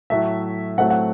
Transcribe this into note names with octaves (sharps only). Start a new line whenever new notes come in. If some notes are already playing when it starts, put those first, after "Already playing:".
A2 F#3 A3 E5
A2 F#3 A3 C4 F#5
F#5